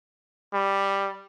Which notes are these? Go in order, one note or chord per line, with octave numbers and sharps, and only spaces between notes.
G3